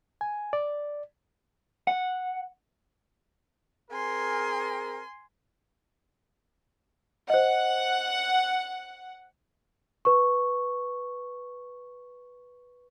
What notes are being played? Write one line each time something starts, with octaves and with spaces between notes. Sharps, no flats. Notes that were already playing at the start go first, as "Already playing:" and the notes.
G#5
D5
F#5
C4 G#4 A#4 G#5 C6
C5 D#5 F#5
B4 C#6